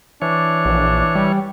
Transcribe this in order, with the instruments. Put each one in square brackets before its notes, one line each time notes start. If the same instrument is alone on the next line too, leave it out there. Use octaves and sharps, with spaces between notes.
[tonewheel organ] E3 C#5 [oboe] D4
[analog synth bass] A#1
G3